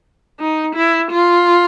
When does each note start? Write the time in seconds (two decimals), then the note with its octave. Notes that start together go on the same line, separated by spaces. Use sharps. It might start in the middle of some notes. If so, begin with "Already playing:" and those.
0.39 D#4
0.75 E4
1.11 F4